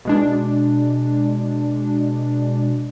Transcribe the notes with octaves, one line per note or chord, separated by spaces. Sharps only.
B2 G#3 D4